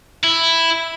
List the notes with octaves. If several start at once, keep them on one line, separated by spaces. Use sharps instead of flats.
E4